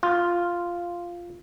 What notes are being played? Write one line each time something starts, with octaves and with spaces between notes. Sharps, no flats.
F4